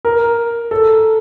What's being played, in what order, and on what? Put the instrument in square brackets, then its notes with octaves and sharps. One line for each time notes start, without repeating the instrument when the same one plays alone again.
[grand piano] A#4
A4